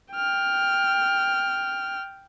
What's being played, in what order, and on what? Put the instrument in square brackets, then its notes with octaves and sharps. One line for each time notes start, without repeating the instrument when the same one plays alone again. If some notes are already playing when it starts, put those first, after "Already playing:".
[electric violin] G5 F6